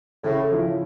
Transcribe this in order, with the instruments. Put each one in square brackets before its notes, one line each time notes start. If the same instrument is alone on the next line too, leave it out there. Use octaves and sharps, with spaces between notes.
[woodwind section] A2 [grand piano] C#3
[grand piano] F3 C#4 E4